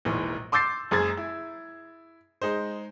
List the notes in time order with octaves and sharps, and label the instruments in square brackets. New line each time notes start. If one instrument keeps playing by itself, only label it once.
[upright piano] E1 A#1 D#3 E3
C6 D6 E6 G6 A6 C7
F#1 F#2 G#3 G#4 G#6 A6
E4
G#3 D#4 C5